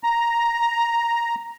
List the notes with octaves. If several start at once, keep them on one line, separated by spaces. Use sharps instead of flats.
A#5